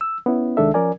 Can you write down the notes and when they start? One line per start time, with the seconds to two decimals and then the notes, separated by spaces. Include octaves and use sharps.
0.01 E6
0.26 B3 C#4 E4
0.57 C2 D#3 G#3 D4 A4 E5
0.74 F3 C#4 A#4 D5 G#5